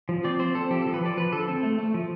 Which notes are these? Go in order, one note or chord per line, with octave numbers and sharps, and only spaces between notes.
F3
C4 D5
C4 C5
C4 A4
F3 G4
F3 A4
B4
F3 D5
F3 B4
D3 A4
C4 A4
A3
A3
F3